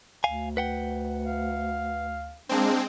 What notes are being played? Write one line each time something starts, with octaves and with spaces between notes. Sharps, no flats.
D2 F5 G#5
B4 F#5 G5
F5
G#3 A#3 C4 D4